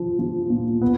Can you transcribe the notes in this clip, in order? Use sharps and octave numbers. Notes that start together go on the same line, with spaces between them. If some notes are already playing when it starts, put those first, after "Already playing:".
Already playing: F3
F3
A#2
B3